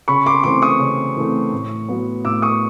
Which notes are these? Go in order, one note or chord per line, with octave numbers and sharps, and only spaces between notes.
C#3 B5 C#6
C6 D6
E3 A3 C4 C6 D6
C#6 D#6
C#3
E3 A3 C4
A2
F#3 B3
A2 D6 E6
C#6 D#6